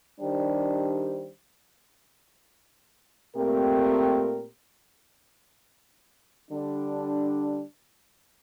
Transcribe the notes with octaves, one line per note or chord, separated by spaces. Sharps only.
D#3 G3 D4 G4 C5
A#2 A3 C4 G4 A#4
D3 G3 D4